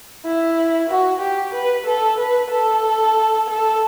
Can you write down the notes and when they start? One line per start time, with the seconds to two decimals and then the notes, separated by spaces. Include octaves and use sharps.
0.25 E4
0.89 F#4
1.21 G4
1.54 B4
1.86 A4
2.19 B4
2.51 A4
3.48 A4